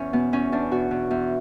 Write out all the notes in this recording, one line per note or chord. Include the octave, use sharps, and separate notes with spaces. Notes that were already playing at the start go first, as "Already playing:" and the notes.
Already playing: E2 C#4
B2 B3
E2 C#4
E2 D4
B2 F#4
B2
E2